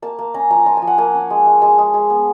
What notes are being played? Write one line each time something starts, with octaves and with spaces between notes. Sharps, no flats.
A#3 A5
A#3
C#4 A#5
F3 A#5
F4 A5
G#5
F3
F#5
A#3 G#5
C#4
G#3
G#3
G#3 A5
G#3
G#3
B3